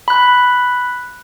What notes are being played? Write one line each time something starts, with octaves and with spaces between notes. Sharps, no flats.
B5 F#6